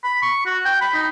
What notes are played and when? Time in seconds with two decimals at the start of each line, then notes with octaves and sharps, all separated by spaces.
0.03 B5
0.22 C#6
0.46 F#4
0.65 G5
0.81 B5
0.94 D#4